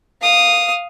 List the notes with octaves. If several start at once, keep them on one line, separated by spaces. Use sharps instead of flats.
F5 D#6